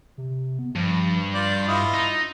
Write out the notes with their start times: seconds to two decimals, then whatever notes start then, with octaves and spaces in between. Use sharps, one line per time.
0.18 C3
0.59 B3
0.76 G2 F3
1.34 F4 D5 G6
1.68 E4 F4 D#5
1.94 D#4 D#6